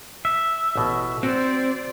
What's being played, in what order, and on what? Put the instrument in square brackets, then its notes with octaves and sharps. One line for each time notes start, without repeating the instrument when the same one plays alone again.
[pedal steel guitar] E5
[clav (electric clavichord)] A1 B2
[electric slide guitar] C4 [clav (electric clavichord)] F#4 [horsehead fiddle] C5 D5